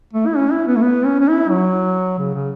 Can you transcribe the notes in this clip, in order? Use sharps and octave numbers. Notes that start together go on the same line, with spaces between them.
A3
E4
C#4
E4
B3
A3
B3
C#4
C#4
E4
F#3
C#3
C#3